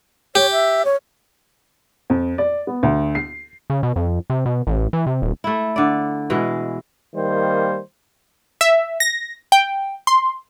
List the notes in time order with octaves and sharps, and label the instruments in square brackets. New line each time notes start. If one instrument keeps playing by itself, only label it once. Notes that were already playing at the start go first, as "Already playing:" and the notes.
[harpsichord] G4 [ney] C#5
[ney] E5
C#5
[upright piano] F2
D5
B3
D2
C7
[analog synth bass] C#3
B2
F2
C3
B2
A1
E3
C3
D#1
[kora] A3 E4
D3 D5
B2 E3 G#3
[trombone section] D#3 G3 A#3 C5
[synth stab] E5
A#6
G5
C6